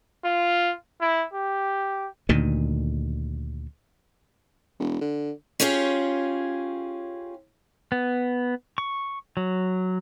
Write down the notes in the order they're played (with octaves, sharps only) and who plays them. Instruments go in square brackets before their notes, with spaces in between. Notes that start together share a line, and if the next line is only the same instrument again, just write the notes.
[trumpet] F4
E4
G4
[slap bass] D2 A#2 D#3
[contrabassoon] E1
D3
[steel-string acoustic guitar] C#4 F4 G4 G#4 C#5
[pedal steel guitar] B3
C#6
F#3